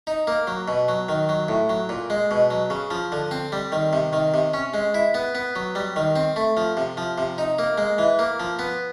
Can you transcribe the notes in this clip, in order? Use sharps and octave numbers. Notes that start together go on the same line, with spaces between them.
D#4
A#3
F#3
B2
F#3
D#3
F#3
A2
F#3
A#2
G#3
B2
F#3
C#3
F3
D3
C4
G3
D#3
C3
D#3
C3
C#4
G#3
E4
B3
B3
F#3
G3
D#3
C4
A3
F3
C3
F3
C3
D#4
A#3
G#3
E3
A#3
F3
B3